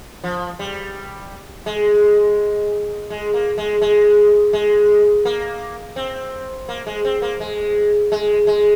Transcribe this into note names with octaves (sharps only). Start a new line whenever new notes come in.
F3
G3
G#3
G#3
A#3
G#3
G#3
G#3
A#3
C4
A#3
G#3
C4
A#3
G#3
G#3
G#3